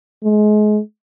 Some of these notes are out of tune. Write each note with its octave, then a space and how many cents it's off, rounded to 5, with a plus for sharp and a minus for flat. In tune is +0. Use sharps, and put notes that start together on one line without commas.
G#3 +30